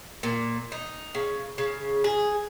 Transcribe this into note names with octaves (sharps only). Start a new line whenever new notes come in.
A#2
D#4
C#3
C#3
G#4